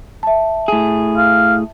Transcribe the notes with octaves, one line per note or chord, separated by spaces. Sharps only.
E5 A5
A2 G#4
F5